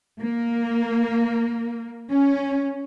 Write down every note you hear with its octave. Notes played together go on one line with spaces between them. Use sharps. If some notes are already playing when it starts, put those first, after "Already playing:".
A#3
C#4